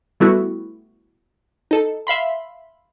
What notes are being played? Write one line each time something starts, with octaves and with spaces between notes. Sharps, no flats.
E3 G3 A3 B3 E4 F#4
D#4 A4
E5 F5 B5 C6